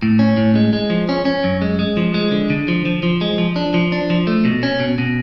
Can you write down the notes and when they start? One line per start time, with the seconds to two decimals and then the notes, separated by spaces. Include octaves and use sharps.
0.02 A2
0.19 C#4
0.37 A2
0.55 G#3
0.73 G#3
0.90 F3
1.09 C#4
1.25 C#4
1.44 F#2
1.62 G#3
1.79 G#3
1.97 F3
2.14 G#3
2.32 D3
2.50 D3
2.68 F3
2.85 F3
3.03 F3
3.21 G#3
3.38 F3
3.56 D4
3.74 F3
3.92 D4
4.10 F3
4.27 A3
4.45 B2
4.63 C#4
4.80 B2
4.98 B2